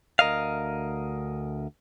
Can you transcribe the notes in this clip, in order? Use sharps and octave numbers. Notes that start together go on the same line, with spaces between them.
D2 A#4 D#5 F5